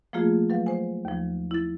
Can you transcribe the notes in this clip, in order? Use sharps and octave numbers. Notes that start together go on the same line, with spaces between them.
F3 A3 A#3 F4 G#4
F#3 B4 F5
C5 G#5
D#2 F3
E4 A6